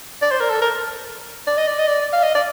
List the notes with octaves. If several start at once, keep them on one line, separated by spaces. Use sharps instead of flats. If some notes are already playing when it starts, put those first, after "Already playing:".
D5
C5
A#4
A4
A#4
D5
D#5
D5
D#5
D5
F5
D#5
D5